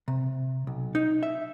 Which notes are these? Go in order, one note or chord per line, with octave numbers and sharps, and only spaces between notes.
C3
B1
D#4
E5